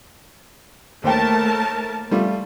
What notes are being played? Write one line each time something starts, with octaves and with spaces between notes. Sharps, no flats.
D#2 A3 A#4 C5 G5 A5
G3 A3 F4